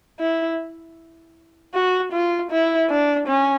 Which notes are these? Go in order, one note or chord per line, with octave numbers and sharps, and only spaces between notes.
E4
F#4
F4
E4
D4
C#4